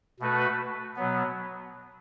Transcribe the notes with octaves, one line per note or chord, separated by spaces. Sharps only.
B2 A3 F#4 B4
B2 F#3 B3